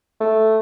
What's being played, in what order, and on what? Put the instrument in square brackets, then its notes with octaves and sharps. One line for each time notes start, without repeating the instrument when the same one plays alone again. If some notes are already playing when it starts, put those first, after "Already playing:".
[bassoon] A3